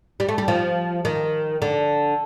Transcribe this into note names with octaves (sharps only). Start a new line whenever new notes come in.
G3
A3
G3
F3
D#3
D3